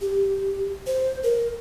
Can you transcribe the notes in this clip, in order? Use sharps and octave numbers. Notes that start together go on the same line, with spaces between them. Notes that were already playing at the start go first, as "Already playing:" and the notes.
G4
C5
A#4